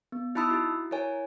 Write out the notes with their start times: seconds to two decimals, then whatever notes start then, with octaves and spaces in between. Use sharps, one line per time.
0.12 B3
0.35 D#4 E4 A5 B5 D#6 E6
0.50 E4 F#4
0.91 E4 A#4 C#5 G#5